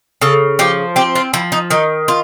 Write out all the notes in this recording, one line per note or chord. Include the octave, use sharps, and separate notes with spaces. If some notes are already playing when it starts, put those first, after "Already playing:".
C#3 A4
F3 G4
C4 G4
F4
F3 E4
D#4
D#3 D#4
F4